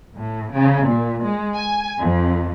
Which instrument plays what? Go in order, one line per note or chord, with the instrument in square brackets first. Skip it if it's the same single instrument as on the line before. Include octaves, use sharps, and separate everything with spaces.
[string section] A2
C#3
A#2
G#3
G#5
F2